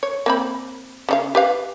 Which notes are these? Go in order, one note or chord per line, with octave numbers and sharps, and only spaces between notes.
C#5
A#3 C4 B5
C#3 D#4 F5
G4 B4 F5